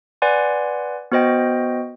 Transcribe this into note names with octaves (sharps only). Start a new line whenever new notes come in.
B4 D5 F#5 G#5 C6
B3 F#4 C5 D#5 G5